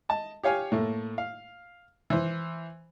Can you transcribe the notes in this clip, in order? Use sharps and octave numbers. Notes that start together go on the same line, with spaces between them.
D#5 A5
G4 C#5 F5 G#5
A2 A3 A#3
F5
E3 C5